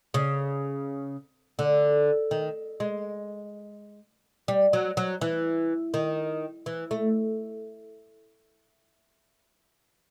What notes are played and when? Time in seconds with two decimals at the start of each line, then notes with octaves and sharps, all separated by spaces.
0.14 C#3
1.59 D3
2.31 D#3
2.80 G#3
4.48 G3
4.73 F#3
4.97 F#3
5.21 E3
5.94 D#3
6.66 E3
6.91 A3